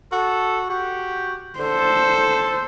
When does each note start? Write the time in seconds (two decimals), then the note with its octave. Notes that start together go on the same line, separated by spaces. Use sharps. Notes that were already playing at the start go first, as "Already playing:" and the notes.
0.12 F#4 A4
0.70 F#4 G4
1.59 D3 A4 C5